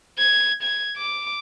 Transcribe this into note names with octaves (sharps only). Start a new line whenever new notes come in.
G#6
G#6
D6